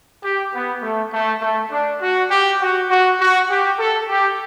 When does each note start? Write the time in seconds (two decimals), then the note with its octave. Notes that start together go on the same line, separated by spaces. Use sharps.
0.23 G4
0.53 B3
0.82 A3
1.13 A3
1.42 A3
1.72 D4
2.02 F#4
2.31 G4
2.61 F#4
2.90 F#4
3.20 F#4
3.50 G4
3.79 A4
4.09 G4